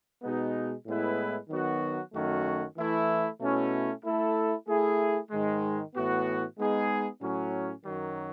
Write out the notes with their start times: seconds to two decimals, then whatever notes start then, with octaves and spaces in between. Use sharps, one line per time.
0.22 B2 G#3 B3 D#4
0.86 A2 G#3 B3 E4 B4
1.49 D#3 F#3 B3 F#4
2.13 F#2 D#3 A3 C#4 F#4
2.77 E3 A3 E4
3.40 B2 A3 C#4 E4
4.03 A3 E4 A4
4.67 A3 E4 G#4
5.30 G#2 D#3 G#3
5.94 A2 E3 B3 F#4
6.57 G#3 B3 D#4 G#4
7.21 A2 F#3 C#4
7.84 F#2 D#3 F#3